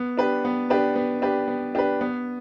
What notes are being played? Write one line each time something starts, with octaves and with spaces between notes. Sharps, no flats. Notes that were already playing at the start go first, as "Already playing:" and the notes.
Already playing: B3
D4 G4 B4
B3
D4 G4 B4
B3
D4 G4 B4
B3
D4 G4 B4
B3